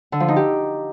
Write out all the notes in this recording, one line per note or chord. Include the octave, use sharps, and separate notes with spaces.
D3
F3
D#4
G4